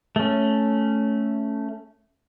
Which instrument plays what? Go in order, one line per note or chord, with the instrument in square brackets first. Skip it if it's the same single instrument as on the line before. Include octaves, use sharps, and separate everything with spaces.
[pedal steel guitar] A3 C#4